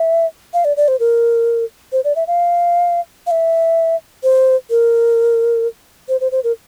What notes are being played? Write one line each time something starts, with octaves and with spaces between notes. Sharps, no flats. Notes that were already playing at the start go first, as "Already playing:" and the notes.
Already playing: E5
F5
D5
D5
C5
A#4
C5
D5
E5
F5
F5
E5
C5
A#4
C5
C5
C5
A#4